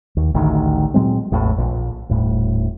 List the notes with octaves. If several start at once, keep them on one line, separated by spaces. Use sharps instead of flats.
D#2
A1 D2 D#3
A#2 F#3 G#3 C4
A1 E2 A2
A#1
D#1 A2